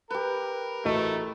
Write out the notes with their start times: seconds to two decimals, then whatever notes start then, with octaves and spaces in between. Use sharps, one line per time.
0.10 G4 A#4 B4
0.85 A1 A3 F#4 D#5